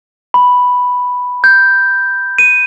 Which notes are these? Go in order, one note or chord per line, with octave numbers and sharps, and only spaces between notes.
B5
G6
D#7